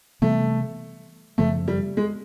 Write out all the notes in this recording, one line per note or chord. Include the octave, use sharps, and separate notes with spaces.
C3 E3 G3 A3 B3
F#2 C#3 F3 A3
G3
G#3